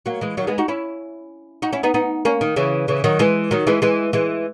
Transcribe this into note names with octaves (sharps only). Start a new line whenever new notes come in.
F#3 A#3
E3 G#3
D#3 F#3
G#3 B3
D#4 F#4
C#4 E4
D#4 F#4
C#4 E4
B3 D#4
B3 D#4
A#3 C#4
D#3
C#3 E3
C#3 E3
D#3 F#3
E3 G#3
D#3 F#3
E3 G#3
E3 G#3
E3 G#3